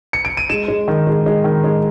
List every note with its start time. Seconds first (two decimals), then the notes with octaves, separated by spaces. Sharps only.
0.13 C#7
0.25 D7
0.37 D#7
0.49 G#3 E7
0.68 G#3
0.88 D#3
1.07 G#3
1.26 G#3
1.44 D#3
1.64 G#3